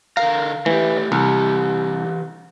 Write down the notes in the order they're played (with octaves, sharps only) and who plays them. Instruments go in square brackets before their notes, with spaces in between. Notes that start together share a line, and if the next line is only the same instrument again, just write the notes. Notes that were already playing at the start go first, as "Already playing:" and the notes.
[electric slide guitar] D3 A#4 A#5 [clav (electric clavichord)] F5
[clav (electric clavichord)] E3 [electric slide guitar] A3 G4
[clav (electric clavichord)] C2 [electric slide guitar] E3 G4